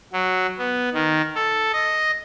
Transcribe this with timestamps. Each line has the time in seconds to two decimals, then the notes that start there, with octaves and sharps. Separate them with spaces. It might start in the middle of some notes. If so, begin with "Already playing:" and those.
0.13 F#3
0.58 B3
0.94 D#3
1.35 A4
1.73 D#5